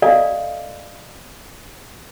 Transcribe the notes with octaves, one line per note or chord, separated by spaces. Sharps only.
A4 D5 D#5 F5 G#5